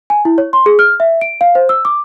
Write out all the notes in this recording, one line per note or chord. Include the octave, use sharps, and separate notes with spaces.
G#5
E4
C#5
C6
G#4
F6
E5
D7
F5
C5
E6
D6